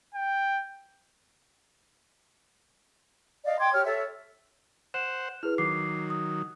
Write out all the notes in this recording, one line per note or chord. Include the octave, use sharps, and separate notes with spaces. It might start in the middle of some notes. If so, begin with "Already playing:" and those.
G5
D5 D#5 F5
G5 C6 D6 G#6
G4 C#5 F6
A4 C#5 E5
C5 F#5 E7
E4 G#4 B4 F6
D#3 F#3 D6 C7
D#6